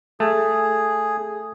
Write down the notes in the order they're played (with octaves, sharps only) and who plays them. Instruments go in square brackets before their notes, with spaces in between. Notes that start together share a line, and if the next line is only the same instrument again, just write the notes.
[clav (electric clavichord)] A3 [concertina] G#4